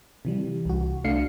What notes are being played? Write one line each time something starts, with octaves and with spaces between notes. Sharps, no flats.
C3 E3 G3
C2 F#4
C2 A3 D4 F5 C7 C#7